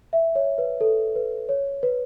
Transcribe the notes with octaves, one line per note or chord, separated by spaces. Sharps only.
E5
C#5
B4
A4
B4
C#5
B4